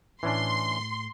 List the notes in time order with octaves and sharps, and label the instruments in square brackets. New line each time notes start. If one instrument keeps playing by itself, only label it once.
[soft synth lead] A2 [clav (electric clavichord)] E3 C#4 D4 [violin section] C6